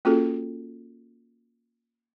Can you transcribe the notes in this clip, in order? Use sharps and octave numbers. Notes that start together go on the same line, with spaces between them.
A#3 C#4 F4 F#4 G#4 A4